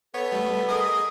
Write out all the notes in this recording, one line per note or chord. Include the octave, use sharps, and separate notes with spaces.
B3 A4 C#5
G3 A3
G#4 A#4 D#5 D#6